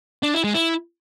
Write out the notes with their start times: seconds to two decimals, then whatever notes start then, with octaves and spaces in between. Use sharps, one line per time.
0.23 D4
0.33 E4
0.44 G#3
0.54 E4